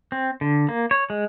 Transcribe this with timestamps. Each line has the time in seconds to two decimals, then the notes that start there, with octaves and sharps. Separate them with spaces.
0.12 C4
0.41 D3
0.69 A#3
0.91 C#5
1.10 G#3